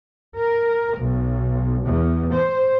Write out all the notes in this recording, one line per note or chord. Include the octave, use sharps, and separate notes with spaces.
A#4
B1
E2
C5